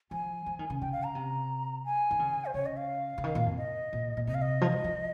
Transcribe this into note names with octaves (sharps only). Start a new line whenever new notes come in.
F3 G#5
F3
D#3
C#3
C#3 G5
F5
A#5
C3
G#5
D#3
C#3
C5
C#3 C#5
D#5
F5
C#3
D#3
A#2
F2
D#5
A#2
A#2
C3 D#5
F5
D#5
F3
G3
F3